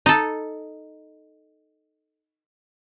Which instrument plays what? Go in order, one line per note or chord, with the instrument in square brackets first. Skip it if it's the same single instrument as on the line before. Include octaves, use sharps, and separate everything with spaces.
[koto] D#4 A4